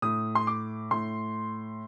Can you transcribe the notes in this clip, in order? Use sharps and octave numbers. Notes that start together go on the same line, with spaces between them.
A2 D#6
C6
D6
A2 C6